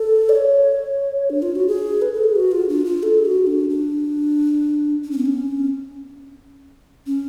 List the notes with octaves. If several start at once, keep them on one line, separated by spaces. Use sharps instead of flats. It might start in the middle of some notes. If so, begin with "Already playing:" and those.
Already playing: A4
D5
C#5
D4
F4
F#4
G#4
B4
A4
G#4
F#4
F4
D4
F4
A4
G#4
F#4
D4
D4
D4
C#4
B3
C#4
C#4